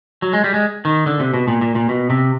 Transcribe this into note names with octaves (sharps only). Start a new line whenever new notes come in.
F#3
G#3
G3
G#3
D#3
D3
C3
B2
A#2
A#2
A#2
B2
C3